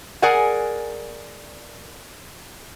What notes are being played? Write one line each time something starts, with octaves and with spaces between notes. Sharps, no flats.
G#4 A#4 D5 F#5 G#5